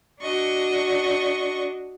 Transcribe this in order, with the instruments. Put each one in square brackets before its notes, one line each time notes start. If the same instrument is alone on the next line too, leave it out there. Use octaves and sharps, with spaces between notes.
[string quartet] D4 F#4 D#5 C#6